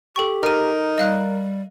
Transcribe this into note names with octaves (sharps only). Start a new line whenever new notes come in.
G4 A4 G5 C#6
D#4 A#4 F6 D#7
G3 D#5 F5 F#6